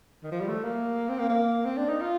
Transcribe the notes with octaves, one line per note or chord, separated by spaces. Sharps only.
D#3
F3
G3
A3
A#3
C4
A#3
A#3
C4
D4
D#4
F4